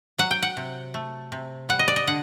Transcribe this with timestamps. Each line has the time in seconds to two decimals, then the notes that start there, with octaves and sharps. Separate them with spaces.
0.18 F#3 F#5
0.31 G5
0.42 F#5
0.57 C3
0.94 A3
1.32 C3
1.69 G3 F#5
1.79 D#5
1.88 D5
1.96 D#5
2.07 D3 F#5